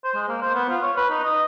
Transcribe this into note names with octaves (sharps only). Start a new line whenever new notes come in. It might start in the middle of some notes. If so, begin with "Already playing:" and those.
C5
G#3
A#3
C5
B3
F4
C#5
B4
D#4
D#5